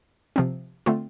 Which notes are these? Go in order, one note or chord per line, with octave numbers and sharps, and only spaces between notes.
C3 F3 C4
D3 A3 C4 F4